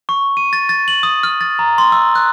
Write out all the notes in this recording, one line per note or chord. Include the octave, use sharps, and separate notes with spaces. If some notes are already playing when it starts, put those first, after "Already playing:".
C#6
D#7
A6
A6
F#7
D#6
F6
A6
A#5
C6
E6
F#6